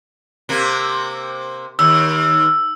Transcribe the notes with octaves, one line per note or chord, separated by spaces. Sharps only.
C3 A#3
D#2 E6